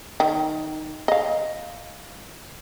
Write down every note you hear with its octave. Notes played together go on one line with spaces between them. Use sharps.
D#3
D#5 F5